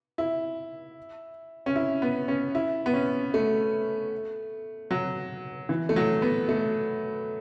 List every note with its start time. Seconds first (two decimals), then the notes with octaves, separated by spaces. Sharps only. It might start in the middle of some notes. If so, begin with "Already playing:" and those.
0.18 E4
1.66 C#4
1.76 E4
2.02 B3
2.28 C#4
2.55 E4
2.86 B3
2.94 C#4
3.34 A3
4.91 F#3
5.69 E3
5.89 A3
5.96 F#3
6.22 B3
6.49 A3